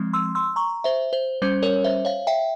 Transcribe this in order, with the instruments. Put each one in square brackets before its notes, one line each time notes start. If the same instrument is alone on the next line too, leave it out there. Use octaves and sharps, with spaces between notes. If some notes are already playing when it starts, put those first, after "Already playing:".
Already playing: [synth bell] F3 G#3 C4
C6 E6
C6 E6
A#5 C#6
C5 E5
C5
G3 C#4 C5
A#4 C#5
C5 E5
C#5 F5
E5 G5